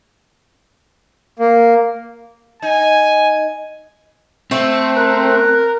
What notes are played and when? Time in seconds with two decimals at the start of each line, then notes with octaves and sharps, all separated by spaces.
1.39 A#3
2.62 D#4 G#5
4.51 A3 C4
4.96 A#4 F#6